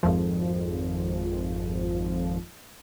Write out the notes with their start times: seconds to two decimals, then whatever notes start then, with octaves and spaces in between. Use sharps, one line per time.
0.03 G#1 F2 F3